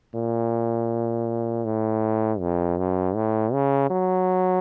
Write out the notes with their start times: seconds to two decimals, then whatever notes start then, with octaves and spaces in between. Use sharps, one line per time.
0.15 A#2
1.65 A2
2.40 F2
2.78 F#2
3.15 A2
3.53 C#3
3.90 F#3